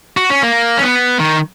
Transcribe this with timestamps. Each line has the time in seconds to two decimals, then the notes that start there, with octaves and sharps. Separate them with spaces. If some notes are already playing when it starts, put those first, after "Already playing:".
0.17 F#4
0.30 C#4
0.43 A#3
0.78 C#4
0.82 B3
1.20 D#3